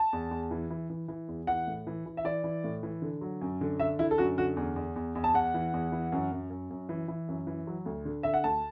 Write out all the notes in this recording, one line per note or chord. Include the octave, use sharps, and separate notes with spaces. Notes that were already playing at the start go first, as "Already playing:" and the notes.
Already playing: A5
E2
E2
E3
E3
E3
E3
E2
E3 F#5
A2
E3
E3
E5
E3 D5
E3
A2
E3
D3
F#3
F#2
D3
D3 E5
D3 E4
A4
F#2 F#4
D3 F#4
E2
E2
E2
E2
A5
E2 F#5
E3
E2
E3
F#2
F#2
F#2
F#2
E3
E3
F#2
E3
F#3
D2
D3
D3 E5
F#5
D2 A5